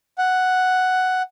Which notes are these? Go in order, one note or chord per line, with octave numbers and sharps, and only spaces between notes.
F#5